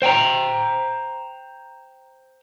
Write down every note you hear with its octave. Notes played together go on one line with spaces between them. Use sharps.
C5 G5 G#5 A#5